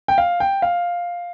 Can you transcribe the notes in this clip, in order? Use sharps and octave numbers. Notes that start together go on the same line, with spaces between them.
G5
F5
G5
F5